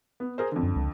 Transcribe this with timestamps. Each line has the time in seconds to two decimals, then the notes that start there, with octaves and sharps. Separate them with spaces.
0.20 B3
0.38 G#4 A#4 C5
0.52 F2 D3
0.63 F#2
0.76 C#2